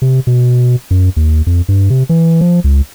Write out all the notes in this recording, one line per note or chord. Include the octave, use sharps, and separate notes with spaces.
C3
B2
F#2
D#2
F2
G2
C3
E3
F3
C#2